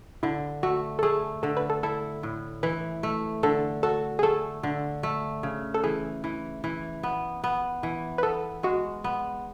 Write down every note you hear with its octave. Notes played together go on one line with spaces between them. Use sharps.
D3 E4
A3 F#4
A4
A3 G#4
D3 A4
B4
A4
E4 A4
A2
E3 B4
A3
D3 A4
F#4 A4
G#4
A3 A4
D3
A3
C#3
A4
E3 G#4
E3
E3
B3
B3
E3
B4
B3 A4
G#3 F#4
B3